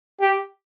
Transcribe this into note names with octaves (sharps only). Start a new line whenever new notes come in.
G4